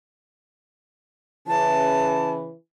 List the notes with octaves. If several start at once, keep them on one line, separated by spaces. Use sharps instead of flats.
C#3 E3 A5